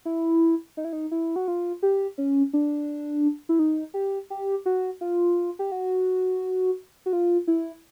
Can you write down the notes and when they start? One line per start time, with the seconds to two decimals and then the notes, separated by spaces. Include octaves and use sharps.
0.05 E4
0.77 D#4
0.85 E4
0.93 D#4
1.11 E4
1.36 F#4
1.48 F4
1.83 G4
2.18 C#4
2.53 D4
3.49 E4
3.59 D#4
3.94 G4
4.30 G4
4.66 F#4
5.01 F4
5.59 G4
5.72 F#4
7.06 F#4
7.13 F4
7.47 E4